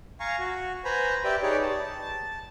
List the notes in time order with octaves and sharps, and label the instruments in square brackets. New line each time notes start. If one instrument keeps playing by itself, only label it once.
[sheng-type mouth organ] F5 G#5 A#5 C#6
F#4
B4 C5 G#5 A#5 B5
G4 B4 D5 E5 G5
D#4 G4 G#4 B4 C#5 D5
A5